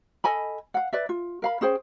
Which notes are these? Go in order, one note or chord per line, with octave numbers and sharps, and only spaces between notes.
A4 D#5 G#5 B5
F5 F#5
B4 D5 E5
F4
A#4 F5 B5
C#4 G#4 C5 G5